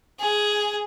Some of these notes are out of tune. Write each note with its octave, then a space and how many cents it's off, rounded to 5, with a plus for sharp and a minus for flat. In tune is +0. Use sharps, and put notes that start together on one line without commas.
G#4 +5